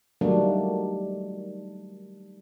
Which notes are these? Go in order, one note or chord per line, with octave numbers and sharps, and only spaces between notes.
D#3 F#3 G3 A3 A#3 D4